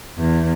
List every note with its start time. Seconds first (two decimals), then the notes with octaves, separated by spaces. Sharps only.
0.18 E2